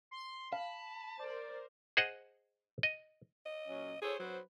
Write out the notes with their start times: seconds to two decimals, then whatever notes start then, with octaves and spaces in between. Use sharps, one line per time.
0.11 C6
0.53 F5 A5 B5
1.20 A#4 C5 D5
1.97 G#4 C5 D#5 F#5
2.83 D#5
3.46 D#5
3.67 A#2 F#3 C#4
4.02 G#4 A4 C5 C#5
4.19 F#3 F#4 B4 C5